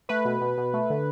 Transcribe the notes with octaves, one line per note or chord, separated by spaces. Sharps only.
A3 B4
B2
B2
B2
A3
D3